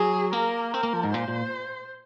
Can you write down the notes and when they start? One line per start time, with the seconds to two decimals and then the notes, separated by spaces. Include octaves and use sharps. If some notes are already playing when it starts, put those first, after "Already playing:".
Already playing: F#3 G#4
0.33 A#3 A#4
0.74 C4 A#4
0.83 A#3
0.93 F3
1.04 G#2
1.14 A#2 C5
1.28 A#2